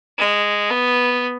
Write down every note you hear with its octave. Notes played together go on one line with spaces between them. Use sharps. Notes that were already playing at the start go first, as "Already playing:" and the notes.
G#3
B3